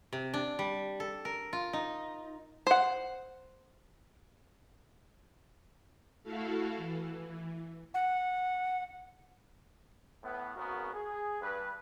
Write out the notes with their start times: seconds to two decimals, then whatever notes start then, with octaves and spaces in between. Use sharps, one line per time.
0.13 C3
0.34 D4
0.59 G3
1.00 A4
1.25 A#4
1.53 F4
1.73 D#4
2.67 C5 F#5
6.23 A3 E4 F#4 A4 F5
6.77 E3
7.94 F#5
10.23 A2 B3
10.56 G#1 C#3 B3 F#4 A#4
10.93 G#4
11.41 G2 B4